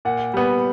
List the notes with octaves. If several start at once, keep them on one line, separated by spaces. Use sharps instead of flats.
A#2 F#5
G3 B3